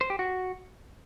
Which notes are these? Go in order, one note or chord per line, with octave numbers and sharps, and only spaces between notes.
C5
G4
F#4